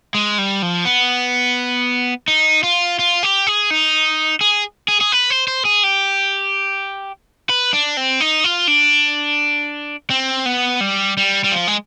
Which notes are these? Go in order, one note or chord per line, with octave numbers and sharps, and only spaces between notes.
G#3
G3
F3
B3
D#4
F4
F4
G4
G#4
D#4
G#4
G#4
G#4
B4
C5
C5
G#4
G4
B4
D4
C4
D#4
F4
D4
C4
B3
G3
G3
G3
F3
G#3